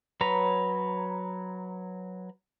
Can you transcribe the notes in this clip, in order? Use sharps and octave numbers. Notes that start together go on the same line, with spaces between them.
F#3 B4 C#5 A#5